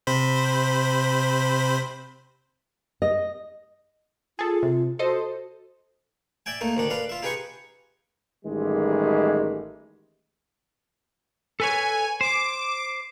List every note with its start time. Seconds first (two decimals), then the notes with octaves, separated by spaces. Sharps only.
0.07 C3 C5 B5
3.02 D#5
4.39 F4 G#4 A4
4.63 C3
4.99 F#4 A4 C5 D#5
6.46 D5 E5 G5 G#5
6.61 A3 A#3 D#4
6.77 D2 D#3 D4
6.90 D4 B4 F5
7.09 F4 E5
7.23 D#4 G4 G#4 B4 D#5 C#6
8.45 A1 D#3 G3 G#3
11.60 A4 B4 C#5 G#5
12.21 C5 D6